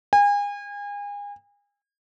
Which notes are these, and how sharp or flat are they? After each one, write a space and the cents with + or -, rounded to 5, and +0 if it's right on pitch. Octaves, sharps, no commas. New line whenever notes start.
G#5 -35